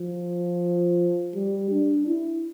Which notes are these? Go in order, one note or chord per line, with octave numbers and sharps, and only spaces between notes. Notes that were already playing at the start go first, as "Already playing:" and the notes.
Already playing: F3
G3
D4
E4